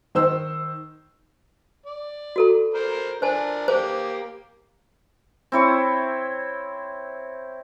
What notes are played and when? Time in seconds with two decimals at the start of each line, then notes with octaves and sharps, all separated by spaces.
0.15 D#3 C5 E6
1.86 D5
2.36 F#4 A4 A#5
2.74 A#4 C5
3.22 D4 A#4 C5 G#5 A5
3.68 A#3 G4 C5
5.52 C4 E4 C#5